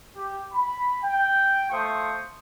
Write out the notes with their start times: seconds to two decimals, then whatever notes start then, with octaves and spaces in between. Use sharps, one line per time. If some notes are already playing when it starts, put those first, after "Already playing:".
0.16 G4
0.52 B5
1.03 G5
1.71 A3 F4 C5 C#6 D#6